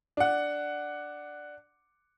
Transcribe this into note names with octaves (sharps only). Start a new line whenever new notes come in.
D4 F#5